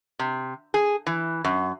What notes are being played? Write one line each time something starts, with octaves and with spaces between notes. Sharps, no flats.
C3
G#4
E3
F#2